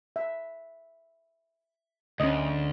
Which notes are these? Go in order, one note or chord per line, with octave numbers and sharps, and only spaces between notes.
E5
D2 C#4 D#5